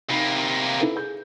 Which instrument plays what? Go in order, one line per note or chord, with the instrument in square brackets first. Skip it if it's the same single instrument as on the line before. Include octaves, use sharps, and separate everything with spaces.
[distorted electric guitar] C3 A#3 [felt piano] D#4 B5
[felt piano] E4 A4 B4
G#4 G6